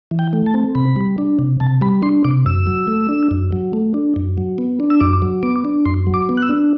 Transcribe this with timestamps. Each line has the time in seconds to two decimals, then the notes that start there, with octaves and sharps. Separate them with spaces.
0.11 E3
0.19 G5
0.33 A3
0.46 A5
0.54 C4
0.75 C3 B5
0.96 G3
1.18 D4
1.39 C3
1.60 C3 A5
1.81 G3 B5
2.02 D4 C6
2.24 C3 D6
2.46 F#2 E6
2.67 F#3
2.87 A3
3.09 D4
3.31 F#2
3.52 F#3
3.73 A3
3.94 D4
4.16 F#2
4.38 F#3
4.58 B3
4.80 D4
4.90 E6
5.00 F#2 D6
5.22 F#3
5.43 B3 D6
5.65 D4
5.86 F#2 C6
6.07 F#3
6.14 D6
6.29 B3
6.37 F#6
6.42 E6
6.49 D4